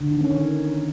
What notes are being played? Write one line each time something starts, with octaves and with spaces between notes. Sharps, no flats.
D3
D#3
C#4
D#3